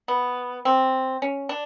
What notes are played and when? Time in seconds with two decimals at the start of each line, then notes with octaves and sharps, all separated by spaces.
0.08 B3
0.65 C4
1.22 C#4
1.49 D4